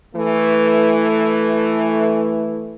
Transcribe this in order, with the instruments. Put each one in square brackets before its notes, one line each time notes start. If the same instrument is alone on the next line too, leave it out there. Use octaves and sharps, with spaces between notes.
[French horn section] E3 A3